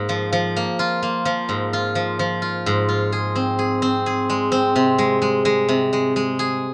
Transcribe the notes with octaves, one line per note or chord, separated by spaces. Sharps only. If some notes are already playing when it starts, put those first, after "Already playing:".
Already playing: G#2 A#3
F3
F3
A#3
F4
A#3
F3
G#2
F4
F3
F3
F4
G#2
F4
G#4
C4
G#4
C4
G#4
G#3
C4
C3
G#3
G#3
G#3
C3
G#3
G#3
G#4